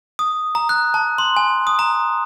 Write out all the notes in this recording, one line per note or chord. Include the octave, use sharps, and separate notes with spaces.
D#6
A#5
F#6
A5
C6
G#5
D#6
A#5